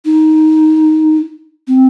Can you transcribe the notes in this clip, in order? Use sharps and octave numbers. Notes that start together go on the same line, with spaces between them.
D#4
C4